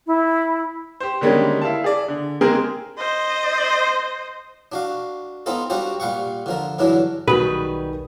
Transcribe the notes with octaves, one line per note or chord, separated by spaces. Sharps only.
E4
G4 C5
D3 D#3 G3 G#3 A#3 C#4
E4 F5 A5
G#4 D5
D3
G#3 A#3 C4 G4 G#4 A#4
C5 D#5
D4 F#4 F5
B3 C4 D#4 F4 A4
G3 C4 D4 F4 F#4 C5
A#2 G3 F5 F#5 C#6
D3 F3 A#4
G2 D3 E3 F#3 D4 E4
B1 D#3 G3 F#4 G#4 B4 D#6